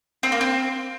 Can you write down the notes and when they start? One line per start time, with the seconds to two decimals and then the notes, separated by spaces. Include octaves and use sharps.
0.23 C4
0.32 A#3
0.41 C4